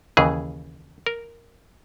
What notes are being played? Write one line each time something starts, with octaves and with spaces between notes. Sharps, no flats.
D#2 C#3 E3 G#4
A#4